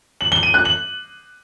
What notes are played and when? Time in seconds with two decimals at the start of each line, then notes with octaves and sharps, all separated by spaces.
0.21 F#7
0.32 G7
0.43 D#7
0.54 F#6
0.65 F#7